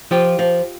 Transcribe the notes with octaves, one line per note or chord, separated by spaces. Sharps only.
F3 F4 G4
F3